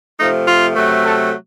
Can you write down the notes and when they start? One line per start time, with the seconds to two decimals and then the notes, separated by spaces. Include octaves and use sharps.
0.19 C3 F3 A3 D#4
0.48 F4
0.76 C3 F#3 A3
1.04 A4